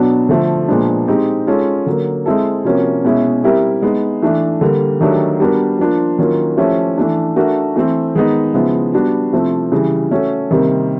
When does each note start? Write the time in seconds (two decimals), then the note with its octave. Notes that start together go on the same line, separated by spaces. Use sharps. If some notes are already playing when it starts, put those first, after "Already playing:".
Already playing: B2 F#3 B3 D4 F#4
0.29 D3 F3 A3
0.68 A#2 F3 G#3 B3 D4
1.07 G#3 C4 D#4 G4
1.47 G#3 C#4 F4 A4
1.86 D3 F#3 A#3
2.26 G#3 C4 E4 A4
2.64 C3 F3 A#3 C#4 F#4
3.04 B2 G#3 C#4 E4
3.44 G3 C4 E4 G4 A#4
3.82 G#3 B3 D#4
4.22 E3 A3 D4
4.61 D3 G3 A#3
5.01 D#3 F#3 A3 D4 G4
5.40 G3 B3 D4 F#4 A#4
5.79 F3 A#3 D4 F4
6.18 D#3 F#3 A#3 C#4 F4
6.57 F3 A3 C#4 E4 G4
6.98 E3 A3 D4
7.36 A3 D4 F#4 A#4
7.76 E3 A3 C4
8.15 D#3 G#3 B3 D#4
8.54 C#3 F3 G#3 B3 E4
8.94 G3 B3 D4 F#4
9.33 C3 F3 A3 C4 E4
9.72 C#3 E3 G3
10.11 A3 C#4 F#4 A4
10.51 C3 D#3 G3 A#3